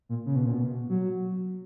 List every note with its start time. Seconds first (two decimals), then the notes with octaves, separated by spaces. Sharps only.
0.09 A#2
0.26 C#3
0.36 B2
0.45 A#2
0.54 B2
0.89 F#3